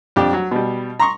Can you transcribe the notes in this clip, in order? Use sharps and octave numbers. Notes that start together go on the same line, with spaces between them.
F2 D4 G4
F#3
B2 G3
A#5 C6 C#6